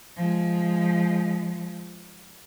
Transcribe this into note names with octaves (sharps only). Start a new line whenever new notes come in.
F3 G#3